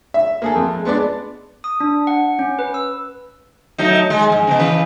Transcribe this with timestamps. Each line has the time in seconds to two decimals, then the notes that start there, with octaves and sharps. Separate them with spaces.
0.14 E5
0.42 A#3 G#4 A4
0.55 F2
0.71 G#3
0.85 G#3 B3 D4 D5
1.64 D#6
1.80 D4
2.07 F#5
2.39 C#4
2.59 B4
2.74 E6
3.78 F#3 A3 D#4
4.10 G#3
4.30 G#2 F3
4.47 C#3 B3
4.59 C#3 E3 B4